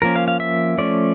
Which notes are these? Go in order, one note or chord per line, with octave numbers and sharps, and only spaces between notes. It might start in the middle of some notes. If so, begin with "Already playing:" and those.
F3 A#3 C#4 A#4
F5
F5
E5
F3 A3 C#4 D5